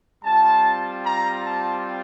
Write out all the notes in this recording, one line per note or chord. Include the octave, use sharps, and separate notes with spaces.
G3 C4 F4 A5
A#5
A5